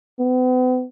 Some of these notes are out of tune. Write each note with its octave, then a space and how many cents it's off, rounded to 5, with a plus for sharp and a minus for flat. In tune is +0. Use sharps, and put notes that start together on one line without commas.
B3 +45